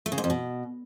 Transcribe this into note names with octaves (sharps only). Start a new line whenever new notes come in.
A3
C#3
G#2
F2
B2